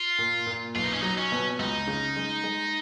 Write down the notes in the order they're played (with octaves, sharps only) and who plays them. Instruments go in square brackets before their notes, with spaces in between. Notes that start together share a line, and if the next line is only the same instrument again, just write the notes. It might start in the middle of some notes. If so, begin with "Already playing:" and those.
Already playing: [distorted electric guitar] F4
[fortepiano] A#2
A#2
[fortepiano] B1 [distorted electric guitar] F4
[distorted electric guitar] D#4
C#4
[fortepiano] F#3 [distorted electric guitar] D#4
[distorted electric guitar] C#4
[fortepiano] B2
[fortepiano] C#2 [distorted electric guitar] D#4
[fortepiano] C#3
G#3
G#3